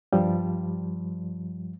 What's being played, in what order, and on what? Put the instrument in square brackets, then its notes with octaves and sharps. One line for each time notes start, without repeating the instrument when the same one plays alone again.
[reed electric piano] G2 F3 G3